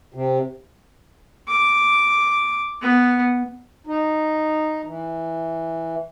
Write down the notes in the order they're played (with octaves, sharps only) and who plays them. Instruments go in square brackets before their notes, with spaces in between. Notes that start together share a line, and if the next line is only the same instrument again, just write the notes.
[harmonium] C3
[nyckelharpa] D6
B3
[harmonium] D#4
E3